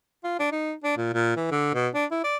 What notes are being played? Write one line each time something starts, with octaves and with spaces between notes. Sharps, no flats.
F4
D4
D#4
D4
A#2
A#2
E3
D3
B2
D4
E4
D5